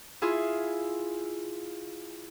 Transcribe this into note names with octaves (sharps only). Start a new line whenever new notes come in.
E4 F4 G#4